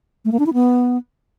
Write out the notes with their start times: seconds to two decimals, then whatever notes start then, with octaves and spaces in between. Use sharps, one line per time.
0.25 A3
0.32 A#3
0.39 D4
0.46 E4
0.54 B3